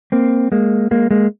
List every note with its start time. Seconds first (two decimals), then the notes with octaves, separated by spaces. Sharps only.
0.12 A#3 C4
0.52 G#3 A#3
0.91 G#3 A#3
1.11 G#3 A#3